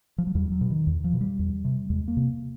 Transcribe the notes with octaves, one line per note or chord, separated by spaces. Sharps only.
F3
F#3
E2 G3
F#3
B2
D#3
E2
F3
B2
G3
E2
C3
E2 G#3
A#3
C3